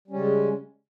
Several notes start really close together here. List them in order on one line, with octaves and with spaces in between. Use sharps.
G3 C#4 C#3 G#3